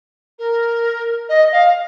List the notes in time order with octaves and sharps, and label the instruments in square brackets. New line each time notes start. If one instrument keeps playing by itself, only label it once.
[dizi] A#4
D#5
F5